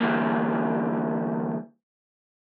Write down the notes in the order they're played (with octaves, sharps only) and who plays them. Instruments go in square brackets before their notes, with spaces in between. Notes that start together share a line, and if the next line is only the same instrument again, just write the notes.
[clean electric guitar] D3 E3 G3 A#3